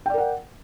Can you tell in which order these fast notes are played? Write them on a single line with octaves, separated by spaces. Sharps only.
G5 D5 A#4 F#5